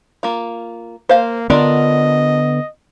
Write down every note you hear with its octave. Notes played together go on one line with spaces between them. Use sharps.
A#3 F4
A#3 C5 F5
D3 B3 D4 F4 A#4 D#5